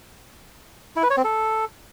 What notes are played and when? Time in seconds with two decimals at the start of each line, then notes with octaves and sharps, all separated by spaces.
0.96 E4
1.03 B4
1.10 C#5
1.17 C4
1.24 A4